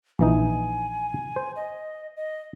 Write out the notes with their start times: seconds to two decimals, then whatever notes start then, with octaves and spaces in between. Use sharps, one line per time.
0.19 A#1 E3 D#4 G#5
1.36 C5
1.56 D#5
2.17 D#5